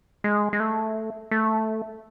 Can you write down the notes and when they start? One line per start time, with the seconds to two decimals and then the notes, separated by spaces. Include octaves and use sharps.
0.24 G#3
0.53 G#3
0.60 A3
1.31 A3